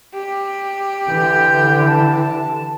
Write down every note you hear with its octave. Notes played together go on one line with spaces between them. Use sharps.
G4
D3 E3 G6
A5